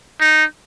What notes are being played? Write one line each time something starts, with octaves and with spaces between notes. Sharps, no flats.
D#4